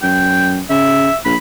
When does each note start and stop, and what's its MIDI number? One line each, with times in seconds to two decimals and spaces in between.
0.03 0.61 42
0.03 0.54 79
0.70 1.09 49
0.70 1.16 76
1.25 1.35 34
1.25 1.37 83